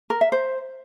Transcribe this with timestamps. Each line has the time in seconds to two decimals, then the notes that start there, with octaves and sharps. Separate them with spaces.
0.10 A#4
0.21 E5
0.32 C5